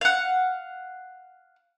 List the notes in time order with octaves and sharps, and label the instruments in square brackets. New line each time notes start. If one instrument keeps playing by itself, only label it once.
[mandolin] F5 F#5